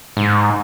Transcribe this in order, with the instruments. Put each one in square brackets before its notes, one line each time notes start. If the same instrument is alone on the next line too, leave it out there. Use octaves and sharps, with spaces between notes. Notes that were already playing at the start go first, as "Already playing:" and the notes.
[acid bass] G#2